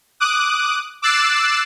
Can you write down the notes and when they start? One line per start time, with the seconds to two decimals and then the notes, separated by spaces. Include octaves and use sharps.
0.20 D6 D#6 F#6
1.02 D6 E6 F#6 A6 C7 E7